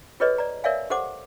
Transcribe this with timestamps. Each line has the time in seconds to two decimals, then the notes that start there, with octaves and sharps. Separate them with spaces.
0.20 F4 G#4 A4 B4 C#5 D#5
0.38 D5 A#5
0.64 A#4 C#5 D5 E5 F5 G#5
0.90 G4 A4 C5 F#5 D6